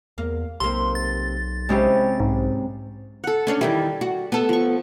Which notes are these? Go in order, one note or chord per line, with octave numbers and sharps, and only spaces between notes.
E2 A#3
B1 C3 A#3 C6
A6
C3 G#3 C4 C#4 E4 G4
B1 G#2
A4 F#5
C#4 D4 C#5
E2 D#3 G3 E4
F#4
B3 A4
F3 C#6